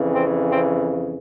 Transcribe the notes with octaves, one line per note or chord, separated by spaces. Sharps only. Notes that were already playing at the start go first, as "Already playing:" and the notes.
Already playing: F2 C#3 E3
C4
C4